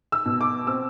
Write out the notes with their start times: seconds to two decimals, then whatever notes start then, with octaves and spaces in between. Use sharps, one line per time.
0.12 E6
0.26 B2
0.41 D6
0.67 C4 E6